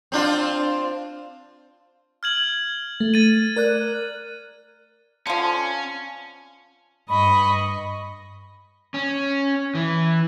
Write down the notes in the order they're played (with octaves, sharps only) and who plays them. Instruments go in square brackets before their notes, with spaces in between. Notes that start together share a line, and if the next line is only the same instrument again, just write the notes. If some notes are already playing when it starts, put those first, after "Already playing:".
[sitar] C4 D4 F4
[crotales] F6 G#6 F#7
[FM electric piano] A3
[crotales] A6 D#7
[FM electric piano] A#4 D5 F#6
[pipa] D3 F3 [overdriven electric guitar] C#4
[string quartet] G2 D#5 C#6 [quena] B5
[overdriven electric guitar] C#4
E3